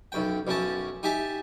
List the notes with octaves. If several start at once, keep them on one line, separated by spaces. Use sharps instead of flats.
B1 F#2 G5
B1 F#2 C#4 A5
D#4 G4 E5 G#5 A5